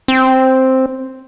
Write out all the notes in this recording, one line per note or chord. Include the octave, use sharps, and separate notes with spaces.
C4